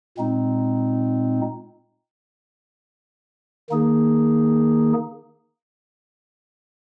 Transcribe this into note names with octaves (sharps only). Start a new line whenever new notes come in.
A#2 G#3 C4 D#4
D#3 A#3 D#4 G#4